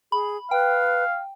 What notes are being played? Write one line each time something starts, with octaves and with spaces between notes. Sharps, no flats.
G#4 B5
B4 F5 G5